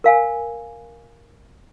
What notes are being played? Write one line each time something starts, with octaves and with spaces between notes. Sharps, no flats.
A#4 F5 G#5